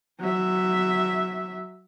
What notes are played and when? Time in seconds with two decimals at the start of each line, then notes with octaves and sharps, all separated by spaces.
0.20 F#3 E5